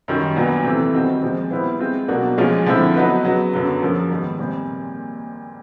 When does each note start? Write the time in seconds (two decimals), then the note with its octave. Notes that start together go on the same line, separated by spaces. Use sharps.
0.08 F#2 D#3 G3
0.36 A#2 F#3 B3 D4 F4
0.65 C3 E3 A3 C4
0.93 D#3 G3 C4 D#4 F#4
1.23 A#2 F3 G#3 C4 F4
1.51 G3 B3 E4 G4 C5
1.79 G#3 C4 F4
2.08 B2 F#3 A#3 D4 F#4
2.38 A#2 F3 G#3 C#4 F4
2.66 D3 F3 A3 C4 E4
2.94 F#3 B3 D#4 F#4 B4
3.24 C#3 F#3 B3
3.53 F#2 D3 F#3 B3
3.82 F#2 C#3 F3 A#3
4.10 G#2 D#3 G3 B3
4.39 A#2 G3 C4